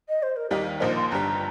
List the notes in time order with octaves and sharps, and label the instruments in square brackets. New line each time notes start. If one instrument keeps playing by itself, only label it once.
[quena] D#5
C5
A#4
[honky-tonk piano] D#2 D#3 G3 D#4 [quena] G4
[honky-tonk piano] A#1 A#2 F3 A#3 D#4 [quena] C5
[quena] C6
[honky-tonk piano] G1 G2 G3 [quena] A#5